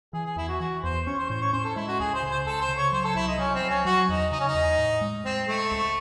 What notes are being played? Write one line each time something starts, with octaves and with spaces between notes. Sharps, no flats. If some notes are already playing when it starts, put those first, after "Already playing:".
E3 G#4
G#4
E2 E4
F#4
E3 F#4
E2 C5
C#4 C#5
C5
A2 C5
C#5
C#4 C5
A4
G#3 E4
F#4
C#2 G#4
C5
C#3
C5
C#2 A4
C5
C#3
C#5
F#3 C5
A4
C2 E4
D#4
F#3 C#4
C4
F#3
C#4
F#3 F#4
E2 D#4
C#3 D#4
C#4
D#4
E2
A2
G#3
G#3 C4
G#3 A3
C#2